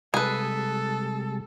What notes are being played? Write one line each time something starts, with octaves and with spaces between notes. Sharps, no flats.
C3 G3 G#3 G#4 A4 B4